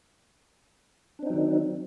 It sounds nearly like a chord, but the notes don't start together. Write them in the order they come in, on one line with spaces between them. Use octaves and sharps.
D4 C4 D#4 F#3 D#3